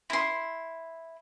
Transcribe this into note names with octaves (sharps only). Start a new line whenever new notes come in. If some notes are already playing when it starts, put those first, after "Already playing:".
E4 C6